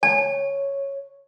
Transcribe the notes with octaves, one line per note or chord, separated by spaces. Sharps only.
C#5 A5